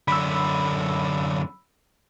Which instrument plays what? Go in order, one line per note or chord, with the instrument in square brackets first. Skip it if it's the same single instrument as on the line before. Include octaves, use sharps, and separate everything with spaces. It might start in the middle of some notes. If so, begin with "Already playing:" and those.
[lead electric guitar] F#2 D3 [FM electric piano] B5 E6